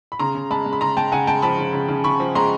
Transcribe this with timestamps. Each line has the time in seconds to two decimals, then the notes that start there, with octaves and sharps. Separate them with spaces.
0.12 B5
0.19 C#3 A#5 C6
0.35 C#3
0.51 G#3 A5 B5
0.66 G#3
0.73 B5
0.81 C#3 A#5 C6
0.97 G#3 G5 A5
1.12 C#3 F#5 G#5
1.27 G#3 G5 A5
1.42 F3 A5 B5
1.59 C#3
1.73 C#3
1.89 C#3
2.04 C#3 B5 C#6
2.20 F3
2.35 G#3 A#5 C6